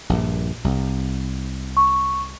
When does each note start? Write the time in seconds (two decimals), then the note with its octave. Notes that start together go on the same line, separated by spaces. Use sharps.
0.09 A#1 G2 A#2
0.64 C2
1.77 C#6